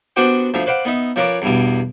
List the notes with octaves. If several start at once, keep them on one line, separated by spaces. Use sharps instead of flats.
B3 D4 F#4 G4 C5
D2 F3 E5 A5
B4 C5 D5 F5 F#5
B3 D#4 E5
F3 C#4 A#4 B4 D5
E2 G2 B2